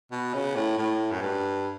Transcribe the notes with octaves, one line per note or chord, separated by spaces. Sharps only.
B2
C#3
A2
A2
F#2
G2